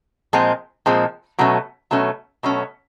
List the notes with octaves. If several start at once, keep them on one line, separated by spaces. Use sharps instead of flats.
A#2 F3 G#3 C4
A#2 F3 G#3 C4
B2 F#3 A3 C#4
B2 F#3 A3 C#4
B2 F#3 A3 C#4